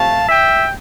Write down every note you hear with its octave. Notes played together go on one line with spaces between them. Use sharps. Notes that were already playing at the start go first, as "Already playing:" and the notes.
Already playing: C3 F3 A3 F5 A5
E5 G5